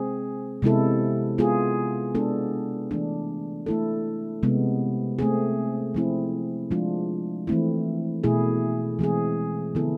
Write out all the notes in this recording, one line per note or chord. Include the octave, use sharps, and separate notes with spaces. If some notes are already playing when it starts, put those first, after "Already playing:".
Already playing: C3 G#3 C4 G#4
C3 G#3 B3 E4 A4
G#3 B3 F4 G#4
G#3 B3 D4 A4
E3 A3 D4
A3 E4 A4
C3 G#3 B3
A3 C4 G#4
F3 A3 C4 E4
F3 G#3 D4 F4
E3 A3 C4 E4
B2 A3 E4 G#4
E3 G#3 C4 G#4
D3 F3 B3 E4 A4